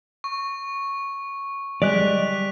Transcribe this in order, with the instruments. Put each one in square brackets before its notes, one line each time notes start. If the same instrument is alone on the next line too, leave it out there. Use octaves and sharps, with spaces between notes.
[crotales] C#6
[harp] G3 [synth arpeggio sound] G#3 [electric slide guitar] D5 [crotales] F#6 B6 F7